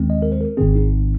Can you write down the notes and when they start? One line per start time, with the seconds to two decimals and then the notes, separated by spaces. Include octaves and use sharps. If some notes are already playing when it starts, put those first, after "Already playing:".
Already playing: D#2 D#3 G#3 C4
0.10 D#5
0.22 A#4
0.32 C5
0.41 A#4
0.57 G#1 G#2 D#3 C4 G#4
0.75 D#4